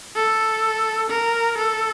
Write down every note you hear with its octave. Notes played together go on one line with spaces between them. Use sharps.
A4
A#4
A4